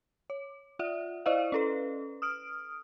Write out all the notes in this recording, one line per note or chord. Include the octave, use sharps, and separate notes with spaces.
C#5
F4 D5 E5
E4 C5 D5 D#5 F5
C#4 A4 B4
D#6 F6 D7